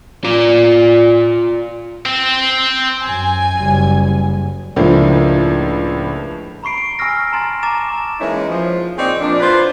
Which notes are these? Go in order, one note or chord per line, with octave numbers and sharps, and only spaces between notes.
F4 D5
C4
F#2 G#5
F#1 G3
C#2 A2 F3 A#3 D4
A#5 B5 C#6 C7 D7
D7
G#5 C#6 E6 F6 A#6
A5 A#5 C6 A6
A5 A#5 D6 A6 E7
E3 G#3 A#3 C#4 D#4 E4
F3
A#2 C4 C#4 D#4 G#4 D5
A#2 F3 A#3 D4
E4 F4 B4 C5 D5